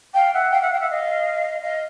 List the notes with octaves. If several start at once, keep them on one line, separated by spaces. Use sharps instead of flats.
F5 G5
E5 F#5
F5 G5
E5 F#5
F5 G5
E5 F#5
D#5 F5
D#5 F5